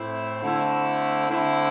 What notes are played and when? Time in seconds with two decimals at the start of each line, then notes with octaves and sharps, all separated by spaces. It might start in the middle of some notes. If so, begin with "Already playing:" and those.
Already playing: A2 A3 C4 E4
0.42 D3 A3 C4 E4
1.28 D3 A3 C4 E4